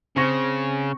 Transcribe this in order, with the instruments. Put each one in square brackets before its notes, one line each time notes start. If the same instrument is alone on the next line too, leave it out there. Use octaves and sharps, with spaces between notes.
[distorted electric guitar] C#3 [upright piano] C4 C#6 A#6